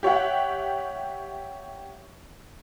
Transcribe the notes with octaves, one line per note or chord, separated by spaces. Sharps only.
G4 C#5 E5 F#5